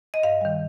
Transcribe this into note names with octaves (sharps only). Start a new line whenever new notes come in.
D#5
G2 F5
D#3 G3